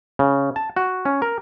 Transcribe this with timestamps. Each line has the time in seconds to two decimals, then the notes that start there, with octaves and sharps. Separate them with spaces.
0.19 C#3
0.56 A5
0.76 F#4
1.05 C#4
1.22 A#4